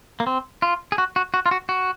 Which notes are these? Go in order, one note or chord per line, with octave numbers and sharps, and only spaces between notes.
A#3
C4
F4
G#4
F#4
F#4
F#4
F4
F#4
F#4